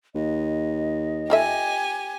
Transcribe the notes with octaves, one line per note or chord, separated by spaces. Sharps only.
D#2 D#5
F4 G4 A4 E5 G#5